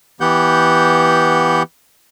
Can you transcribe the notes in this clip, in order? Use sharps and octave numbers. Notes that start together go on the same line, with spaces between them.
E3 B3 G4 F#5 G6